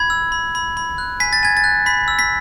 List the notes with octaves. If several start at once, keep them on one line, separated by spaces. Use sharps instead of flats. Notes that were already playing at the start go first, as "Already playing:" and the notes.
Already playing: B5 G#6
E6
B5
B5
B5
F#6
G#5 B6
A6
G#5 G#6
A6
F#6
B5 B6
E6
B6